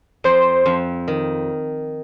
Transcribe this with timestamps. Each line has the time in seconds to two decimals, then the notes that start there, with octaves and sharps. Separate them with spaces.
0.24 F2 C5
0.66 F2
1.08 D#3